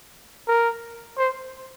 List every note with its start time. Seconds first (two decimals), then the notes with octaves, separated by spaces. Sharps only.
0.48 A#4
1.18 C5